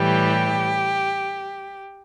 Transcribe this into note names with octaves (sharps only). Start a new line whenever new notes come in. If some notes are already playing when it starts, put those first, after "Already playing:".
Already playing: A2 E3 G3 G4